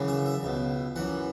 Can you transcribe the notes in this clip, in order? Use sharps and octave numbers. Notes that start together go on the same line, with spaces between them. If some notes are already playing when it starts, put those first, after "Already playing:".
Already playing: F#2 C#3 E3
E5
E5
C#2 B2
F#2 E3 F#5